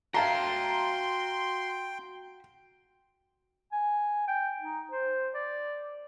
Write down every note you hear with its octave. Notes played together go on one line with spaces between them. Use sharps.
F#4 E5 F5 G5 A5 A#5 C6
G#5
G5
D#4
C5
D5